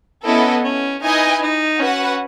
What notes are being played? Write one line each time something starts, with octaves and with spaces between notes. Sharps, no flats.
B3 C#4 E4 A4 D#5
C#4
D#4 E4 B4 D#5 G#5
D#4
C#4 F#4 B4 F#5